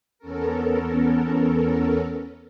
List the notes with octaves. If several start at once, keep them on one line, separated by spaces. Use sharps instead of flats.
E2 B3 C#4 A4 A#4